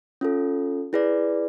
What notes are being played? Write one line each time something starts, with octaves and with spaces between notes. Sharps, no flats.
C#4 F4 A4
E4 G#4 B4 D5